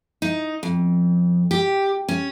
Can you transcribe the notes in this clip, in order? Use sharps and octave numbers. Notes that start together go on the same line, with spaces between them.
D#4
F2
G4
C#4